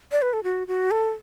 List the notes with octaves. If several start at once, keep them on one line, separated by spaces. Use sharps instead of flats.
D5
B4
A4
F#4
F#4
A4